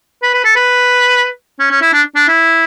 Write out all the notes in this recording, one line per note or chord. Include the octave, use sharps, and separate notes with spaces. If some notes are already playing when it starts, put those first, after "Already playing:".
B4
B4
A4
B4
C#4
C#4
E4
D4
D4
E4